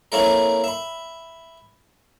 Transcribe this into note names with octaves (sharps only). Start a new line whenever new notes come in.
A#3 C4 C#4 E4 A4 A#4
E5 B5